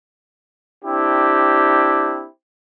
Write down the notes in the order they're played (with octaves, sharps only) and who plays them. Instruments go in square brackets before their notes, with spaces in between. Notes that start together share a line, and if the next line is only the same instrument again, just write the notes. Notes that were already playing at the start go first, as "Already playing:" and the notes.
[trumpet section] C4 D4 E4 G4